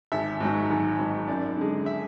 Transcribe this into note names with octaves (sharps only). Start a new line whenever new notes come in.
G#1 E5
G#2 F#3
G#1
G#2 F#3
F#2 D5
D3 G#3
E5